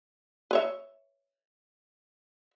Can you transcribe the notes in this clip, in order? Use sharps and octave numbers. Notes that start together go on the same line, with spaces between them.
B4 C#5 E5